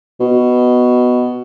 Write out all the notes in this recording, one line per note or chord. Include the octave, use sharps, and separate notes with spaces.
B2